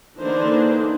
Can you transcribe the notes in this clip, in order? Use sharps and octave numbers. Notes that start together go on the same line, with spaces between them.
D3 E3 A#3 D4 D#4 C5